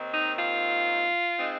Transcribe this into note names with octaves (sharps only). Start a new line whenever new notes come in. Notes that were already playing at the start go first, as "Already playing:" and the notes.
Already playing: D#2 D#3 C4
D#4
F4
G#3 C4 D#4